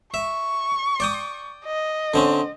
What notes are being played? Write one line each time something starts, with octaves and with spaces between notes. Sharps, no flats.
E5 C#6
D5 G5 D#6
D#5
D3 C4 C#4